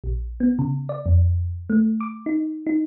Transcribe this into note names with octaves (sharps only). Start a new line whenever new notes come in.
A#1
B3
C#3
D5
F2
A3
D6
D#4
D#4